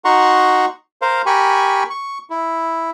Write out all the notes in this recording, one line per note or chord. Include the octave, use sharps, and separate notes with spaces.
D#4 F#4 F#5 A#5 C6 C#6
A#4 C5 F5
G4 A#4 G#5 B5 C#6
C#6
E4